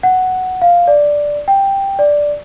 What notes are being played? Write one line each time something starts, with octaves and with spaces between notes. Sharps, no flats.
F#5
F5
D5
G5
D5